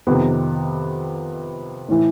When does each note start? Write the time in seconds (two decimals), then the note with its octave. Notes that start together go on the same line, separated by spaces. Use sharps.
0.07 F2 C3 D#3 B3
1.89 A2 E3